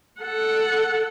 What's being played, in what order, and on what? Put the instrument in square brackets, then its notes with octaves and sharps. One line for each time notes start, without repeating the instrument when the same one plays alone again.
[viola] A4 F#5